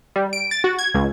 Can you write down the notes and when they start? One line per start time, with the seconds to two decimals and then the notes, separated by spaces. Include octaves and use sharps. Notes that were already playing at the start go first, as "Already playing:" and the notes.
0.16 G3
0.33 D7
0.51 A6
0.64 F#4
0.79 G#6
0.94 C#2